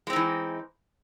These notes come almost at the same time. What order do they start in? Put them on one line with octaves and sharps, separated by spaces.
G#3 C4 D#4 E3